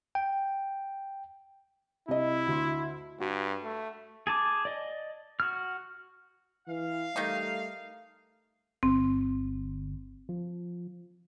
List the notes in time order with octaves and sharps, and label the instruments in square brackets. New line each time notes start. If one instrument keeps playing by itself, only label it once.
[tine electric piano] G5
[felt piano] C2 D#5 [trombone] E4
[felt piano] D2 C6
[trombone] G2 [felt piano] F#4
[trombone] A3
[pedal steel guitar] G#4 A5 D6
D5 D#5
F#4 F6
[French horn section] E3 [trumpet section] F5
[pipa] D#3 A#3 D#4 [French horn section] G3 A3
[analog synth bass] G1 [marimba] C4
[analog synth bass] F3